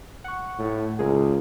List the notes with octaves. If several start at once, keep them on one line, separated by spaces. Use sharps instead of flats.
F#5 C#6
A2
C#2 G#4 A#4